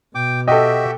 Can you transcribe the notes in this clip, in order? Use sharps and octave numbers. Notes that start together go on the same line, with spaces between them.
B2 G5 D6
F#4 G4 A4 D#5 E5 G5